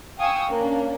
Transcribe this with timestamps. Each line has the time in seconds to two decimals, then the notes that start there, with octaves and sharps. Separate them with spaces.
0.18 F5 G5 G#5 C#6 D#6 E6
0.50 A#3 C#4 D4